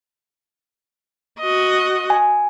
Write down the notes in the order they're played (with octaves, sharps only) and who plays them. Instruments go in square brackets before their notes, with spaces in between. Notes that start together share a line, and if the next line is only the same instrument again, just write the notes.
[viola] F#4 D#5
[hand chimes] G#5